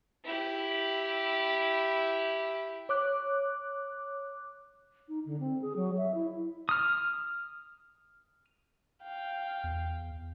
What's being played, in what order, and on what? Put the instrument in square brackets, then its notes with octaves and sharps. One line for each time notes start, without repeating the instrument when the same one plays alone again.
[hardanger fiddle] E4 G4
[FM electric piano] C#5 D6 F#6
[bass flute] D#4
D3
C4
G#4
F#3
E5
E4
[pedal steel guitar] D#6 F6
[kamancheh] F5 G5
[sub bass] E2